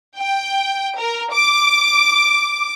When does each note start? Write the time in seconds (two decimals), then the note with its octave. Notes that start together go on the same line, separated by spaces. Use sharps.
0.18 G5
0.99 A#4
1.32 D6